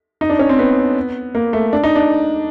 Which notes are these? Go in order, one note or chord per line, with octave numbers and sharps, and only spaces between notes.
D#4
D4
C#4
C4
B3
A#3
A3
D4
D#4
D4